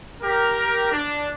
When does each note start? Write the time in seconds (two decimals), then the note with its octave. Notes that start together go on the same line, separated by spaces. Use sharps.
0.22 G4 A#4
0.91 D4